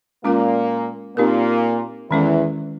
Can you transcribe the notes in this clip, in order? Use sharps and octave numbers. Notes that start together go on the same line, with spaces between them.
A#2 G#3 A#3 C#4 F4 A#4
A#2 A#3 C4 D#4 G4 A#4
E2 D#3 E3 G#3 C#4 E4 A4